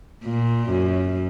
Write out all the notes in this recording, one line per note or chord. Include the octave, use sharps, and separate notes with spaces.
A#2
F#2